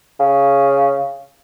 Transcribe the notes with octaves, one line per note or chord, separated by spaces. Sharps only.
C#3